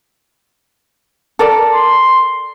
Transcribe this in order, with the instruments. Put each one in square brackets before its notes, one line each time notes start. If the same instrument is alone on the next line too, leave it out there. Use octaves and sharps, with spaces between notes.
[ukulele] A4 A#4 D5
[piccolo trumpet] C6